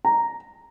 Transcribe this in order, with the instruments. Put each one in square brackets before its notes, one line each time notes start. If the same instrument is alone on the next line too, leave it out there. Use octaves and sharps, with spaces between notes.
[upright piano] A#5